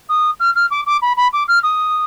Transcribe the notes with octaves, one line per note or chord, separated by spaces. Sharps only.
D#6
F6
F6
D6
D6
B5
B5
D6
F6
D#6